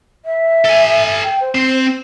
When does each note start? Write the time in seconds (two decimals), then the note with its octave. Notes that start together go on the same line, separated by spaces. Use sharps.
0.25 E5
0.65 A4 G#5
1.23 G5
1.41 C5
1.55 C4